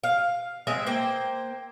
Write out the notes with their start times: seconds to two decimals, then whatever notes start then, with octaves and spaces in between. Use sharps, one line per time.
0.04 F5
0.67 G#3 C4 E5 G#5
0.87 A#3 C5 G5